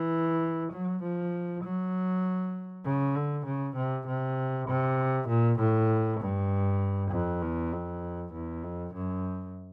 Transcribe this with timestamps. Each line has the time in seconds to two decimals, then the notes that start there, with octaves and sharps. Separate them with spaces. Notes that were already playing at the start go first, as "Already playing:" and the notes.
Already playing: E3
0.72 F#3
1.02 F3
1.63 F#3
2.85 C#3
3.15 D3
3.46 C#3
3.76 C3
4.07 C3
4.68 C3
5.28 A#2
5.59 A2
6.20 G2
7.11 F2
7.42 E2
7.72 F2
8.33 E2
8.63 F2
8.94 F#2